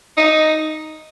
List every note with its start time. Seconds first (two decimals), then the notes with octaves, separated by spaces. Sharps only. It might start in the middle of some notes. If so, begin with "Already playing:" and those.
0.17 D#4